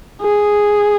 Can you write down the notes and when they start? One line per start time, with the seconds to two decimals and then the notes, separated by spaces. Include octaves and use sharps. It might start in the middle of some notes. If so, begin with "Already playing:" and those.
0.22 G#4